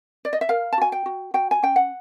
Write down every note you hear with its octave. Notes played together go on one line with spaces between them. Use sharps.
D5
D#5
E5
A#4 F5
A5
F#4 G#5
G5
F#4
F#4 G5
G#5
C#4 G5
F#5